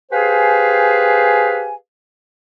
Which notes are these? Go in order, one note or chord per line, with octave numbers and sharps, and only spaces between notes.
G4 G#4 B4 C5 F5 G#5